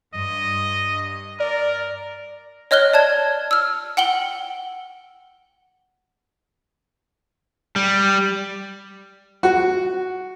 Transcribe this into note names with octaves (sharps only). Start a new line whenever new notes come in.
G2 D#5
A#4 D5
C#5 D#5 F6 F#6 G7
D5 A5 G#6
E6 F6
F#5 G5 F#7 G7
G3
F#4